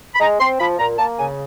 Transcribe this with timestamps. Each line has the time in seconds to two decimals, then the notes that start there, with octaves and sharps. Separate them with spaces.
0.15 B5
0.20 G#3 A#5
0.40 C4 C6
0.59 F3 B5
0.79 A#2 A#5
0.98 A#3 A5
1.18 C#3 G#5